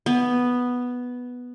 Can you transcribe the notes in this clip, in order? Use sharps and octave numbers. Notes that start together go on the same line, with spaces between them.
B3